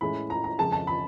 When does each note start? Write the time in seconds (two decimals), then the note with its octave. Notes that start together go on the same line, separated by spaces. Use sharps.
0.01 A2 E3 G#3 C#4 E4 B5
0.30 A#5
0.44 A#5
0.59 F2 C#3 F3 G#3 A5
0.72 A5
0.87 B5